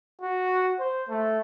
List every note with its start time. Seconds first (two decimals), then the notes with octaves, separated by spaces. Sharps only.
0.21 F#4
0.80 C5
1.09 A3